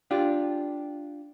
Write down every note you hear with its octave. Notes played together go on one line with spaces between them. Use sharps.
D4 F4 G4